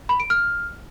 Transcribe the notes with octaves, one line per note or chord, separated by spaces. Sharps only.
B5
D7
F6